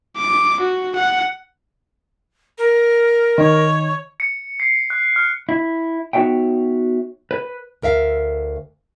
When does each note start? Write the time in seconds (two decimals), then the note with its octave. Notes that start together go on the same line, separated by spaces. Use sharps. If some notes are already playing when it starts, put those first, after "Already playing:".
0.17 D6
0.60 F#4
0.96 F#5
2.58 A#4
3.38 D#3 C#5
4.20 C#7
4.60 C7
4.90 F#6
5.16 F6
5.49 E4
6.13 B3 D#4 F#4 C#5 E5 G5
7.31 B4
7.82 D2 A#4 E5 F5